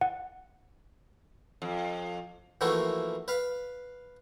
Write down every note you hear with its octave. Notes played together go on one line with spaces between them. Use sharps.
F#5
F2
E3 F3 A3 A#3 F#4
B4 F5